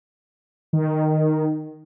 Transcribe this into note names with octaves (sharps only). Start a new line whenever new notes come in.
D#3